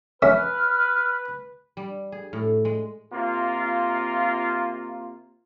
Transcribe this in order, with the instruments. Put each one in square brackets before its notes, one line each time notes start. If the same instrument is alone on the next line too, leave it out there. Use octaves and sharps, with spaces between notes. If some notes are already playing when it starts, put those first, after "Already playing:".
[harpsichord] C#4 A#4 E5 [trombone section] B4 [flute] F6
[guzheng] G3
G#4
A2
G#3
[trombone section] C3 A#3 F4